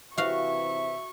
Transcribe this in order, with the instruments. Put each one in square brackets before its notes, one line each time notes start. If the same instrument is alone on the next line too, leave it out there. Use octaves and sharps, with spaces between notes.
[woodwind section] C3 E3 [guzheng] F#4 F5 [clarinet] E5 [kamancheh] C#6